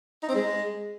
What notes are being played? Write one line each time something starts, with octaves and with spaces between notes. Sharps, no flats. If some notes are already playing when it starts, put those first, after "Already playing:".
D#4
C4
G#3